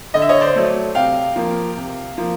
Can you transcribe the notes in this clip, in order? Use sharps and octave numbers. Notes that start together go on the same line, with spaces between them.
D3 D#5
E5
C#5 D#5
C5 D5
F#3 A3
C3 F5 G5
F3 A#3
C3
F3 A#3